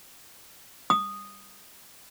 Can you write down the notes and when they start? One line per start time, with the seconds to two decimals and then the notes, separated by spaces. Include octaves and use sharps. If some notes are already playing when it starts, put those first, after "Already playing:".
0.90 D#6